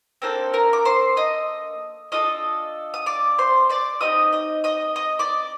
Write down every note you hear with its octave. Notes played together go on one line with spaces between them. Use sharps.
A#3 C4 D4 A4 C5
A#4 A#5
D6
C5 C6
D#5 D#6
D4 F4 A4 D#5 D#6
D#6
D5 D6
C5 C6
D5 D6
C4 D#4 G4 D#5 D#6
D#5 D#6
D#5 D#6
D#5 D#6
D5 D6